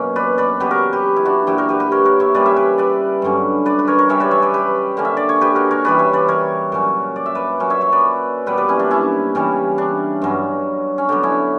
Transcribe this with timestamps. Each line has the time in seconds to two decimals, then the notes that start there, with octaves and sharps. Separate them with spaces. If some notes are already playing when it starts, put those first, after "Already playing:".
Already playing: F#2 B2 F#3 A#3 C#4
0.16 B4 D5
0.38 B4 D5
0.60 C#3 F#3 B3 G4 B4
0.71 F#4 A#4
0.93 G4 B4
1.16 E4
1.25 D4 F#4
1.47 A#2 F#3 B3 E4 G4
1.58 F#4 A#4
1.69 G4 B4
1.80 G4 B4
1.92 A#4 C#5
2.05 A#4 C#5
2.20 C#5 E5
2.34 C#3 G3 A#3 B4 D5
2.46 C#5 E5
2.57 B4 D5
2.78 B4 D5
3.22 G2 D3 F#3 C#4
3.66 B4 D5
3.79 B4
3.87 A#4 C#5
3.99 A#4 C#5
4.09 C#3 G3 C#4 C#5 E5
4.20 B4 D5
4.31 C#5 E5
4.42 B4 D5
4.54 G4 B4
4.97 D3 A#3 C#4
5.05 E5
5.17 D5
5.29 C#5
5.41 G4 B4
5.55 F#4 A#4
5.71 A#4 C#5
5.85 C#3 E3 G3 B4 D5
5.99 C#5 E5
6.13 B4 D5
6.29 A#4 C#5
6.72 A#2 F#3 C#4
7.16 D5
7.26 E5
7.35 B4 D5
7.60 A#2 F#3 C#4
7.70 C#5 E5
7.81 C#5 E5
7.92 B4 D5
8.46 A#2 G3 B3 B4 D5
8.57 B4 D5
8.69 C#4 E4
8.80 D4
8.91 C#4 E4
9.35 C#3 E3 G3 C#4
9.78 D4
10.22 G2 F#3 C#4
10.98 C#4
11.09 D3 F#3 B3 D4
11.23 C#4 E4